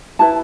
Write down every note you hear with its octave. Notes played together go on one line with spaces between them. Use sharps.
E4 B4 A5